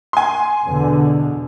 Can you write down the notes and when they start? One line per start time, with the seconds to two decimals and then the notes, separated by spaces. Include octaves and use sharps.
0.13 G#5 C6
0.64 E2 B2 D3